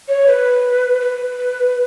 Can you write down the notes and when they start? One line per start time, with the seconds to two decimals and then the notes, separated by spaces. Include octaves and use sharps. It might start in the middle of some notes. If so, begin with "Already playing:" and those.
0.08 C#5
0.27 B4
1.01 B4